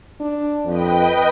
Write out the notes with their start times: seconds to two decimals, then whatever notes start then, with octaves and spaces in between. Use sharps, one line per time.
0.20 D4
0.66 F2 B4 D#5 G5